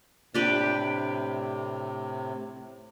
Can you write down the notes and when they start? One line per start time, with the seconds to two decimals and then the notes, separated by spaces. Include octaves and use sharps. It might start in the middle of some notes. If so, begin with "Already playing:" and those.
0.34 A2 C3 D4 G4 B4